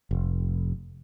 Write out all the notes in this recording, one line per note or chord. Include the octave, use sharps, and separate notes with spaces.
F1